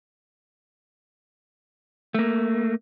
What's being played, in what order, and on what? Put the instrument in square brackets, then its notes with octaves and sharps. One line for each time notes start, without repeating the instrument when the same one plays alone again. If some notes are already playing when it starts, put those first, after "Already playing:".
[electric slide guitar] A3 A#3